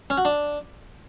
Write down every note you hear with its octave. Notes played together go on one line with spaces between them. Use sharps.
C#4
F#4
D4